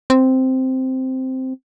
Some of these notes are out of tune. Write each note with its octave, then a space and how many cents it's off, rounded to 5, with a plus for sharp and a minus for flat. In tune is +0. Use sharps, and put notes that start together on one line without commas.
C4 -5